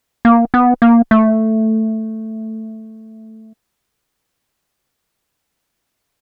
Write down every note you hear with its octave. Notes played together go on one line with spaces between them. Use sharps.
A#3
B3
A#3
A3